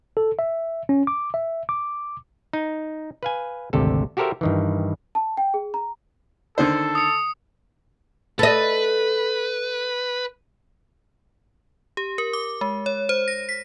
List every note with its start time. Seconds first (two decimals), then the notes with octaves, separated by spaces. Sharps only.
0.17 A4
0.39 E5
0.89 C#4
1.07 D6
1.34 E5
1.69 D6
2.53 D#4
3.23 B4 F5 G#5
3.73 G#1 D2 C3 G4 A4
4.17 F#4 G4 A4 A#4 C5 E5
4.41 G2 D#3 E3
5.15 A5
5.37 G5
5.54 G#4
5.74 A#5
6.58 D3 D#3 A4 C5
6.95 D#6 C#7
8.39 A4 B4 D#5
11.97 G4
12.18 A#4
12.33 D6
12.61 G#3
12.86 C#5
13.09 C5
13.28 A#6
13.49 B6